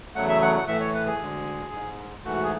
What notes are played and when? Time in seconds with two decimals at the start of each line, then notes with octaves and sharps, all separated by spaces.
0.15 E2 C#3 F#3 A3 F#5
0.28 E5
0.42 F#5
0.55 F#5
0.67 A2 E3 A3 E5
0.80 C#5
0.94 B4
1.07 G#4
1.20 D2 D3 G#3
1.73 G#2 G#3
2.24 G#2 E3 A3 F#4
2.44 G#4